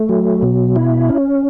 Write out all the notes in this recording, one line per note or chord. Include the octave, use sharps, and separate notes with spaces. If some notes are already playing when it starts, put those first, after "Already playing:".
Already playing: A3
F#3
B2
E4
C#4